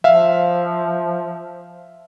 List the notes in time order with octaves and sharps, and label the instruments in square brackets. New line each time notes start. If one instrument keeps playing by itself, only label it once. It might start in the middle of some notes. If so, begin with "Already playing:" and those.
[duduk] F3 [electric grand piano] E5 F5